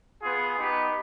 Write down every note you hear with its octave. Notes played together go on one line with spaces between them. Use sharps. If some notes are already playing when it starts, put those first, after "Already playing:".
B3 F4 G#4
B3 D#4 G4 B4